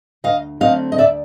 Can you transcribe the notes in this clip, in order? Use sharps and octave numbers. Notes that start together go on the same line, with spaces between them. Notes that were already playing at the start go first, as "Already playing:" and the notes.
D2 D#5 F5
D3 F#3 A3 C4 D#5 F5
D#5
D2 D5 E5